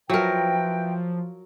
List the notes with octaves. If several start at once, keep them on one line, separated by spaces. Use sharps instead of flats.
F3 F#3 E4 A#4 B4 G5